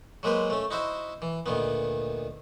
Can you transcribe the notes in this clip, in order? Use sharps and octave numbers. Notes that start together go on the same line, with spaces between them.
F#3 G#3 A#3 B4 C5
A3 C#4
D#4 E4 F#4 C5 E5
E3
D2 A#2 D#3 B3